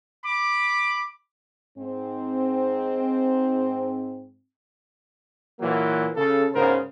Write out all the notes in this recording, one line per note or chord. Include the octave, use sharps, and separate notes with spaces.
B5 D6
G#2 C4
A#2 E3 F#3 A#3
C#3 A4
G#2 C#3 B3 A#4 C5